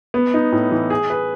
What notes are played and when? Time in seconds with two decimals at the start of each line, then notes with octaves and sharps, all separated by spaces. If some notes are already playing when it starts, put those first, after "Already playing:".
0.14 B3
0.34 D#4
0.52 A2
0.71 E3
0.90 G#4
1.10 B4